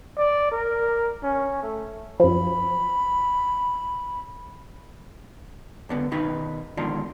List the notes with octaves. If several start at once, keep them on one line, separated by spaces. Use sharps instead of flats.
D5
A#4
C#4
A3
F#2 F3 B5
C#2 D3 B3
B2 D#3 D#4 B4
G#2 B2 D3 D#3 D4 F4